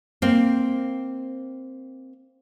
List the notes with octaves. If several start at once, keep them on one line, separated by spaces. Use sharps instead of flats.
A#3 C4